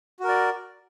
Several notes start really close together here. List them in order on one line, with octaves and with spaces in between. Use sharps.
F#4 A#4 D5